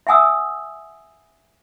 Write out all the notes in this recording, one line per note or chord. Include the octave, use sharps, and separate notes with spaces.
E5 F#5 G#5 D#6 E6